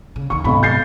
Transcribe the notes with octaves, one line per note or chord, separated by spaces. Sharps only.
C#3
D#2 D#3 C#6
B1 G#2 C3 B5
G6 A6 C7